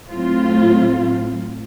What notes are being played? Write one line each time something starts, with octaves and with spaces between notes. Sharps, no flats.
A2 F#3 A3 C4 F4